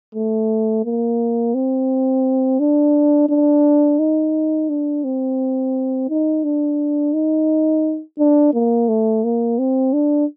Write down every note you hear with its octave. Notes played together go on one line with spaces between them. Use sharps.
A3
A#3
C4
D4
D4
D#4
D4
C4
D#4
D4
D#4
D4
A#3
A3
A#3
C4
D4